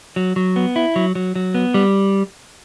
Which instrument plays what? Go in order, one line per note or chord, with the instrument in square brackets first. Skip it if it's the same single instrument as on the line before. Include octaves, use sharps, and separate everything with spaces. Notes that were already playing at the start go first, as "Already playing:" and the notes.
[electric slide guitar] F#3
F#3
B3
E4
F#3
F#3
F#3
B3
G3